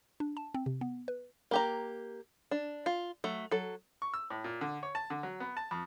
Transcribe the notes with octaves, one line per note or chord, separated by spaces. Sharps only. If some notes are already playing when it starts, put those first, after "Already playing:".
D4
A5
C4
C3
B3
B4
A#3 G4 A#5
D4
F4
F#3 A3
F#3 A4
C#6
E6
A2
A#2
D3
C#5
A5
D3
F#3
B3
A5
F2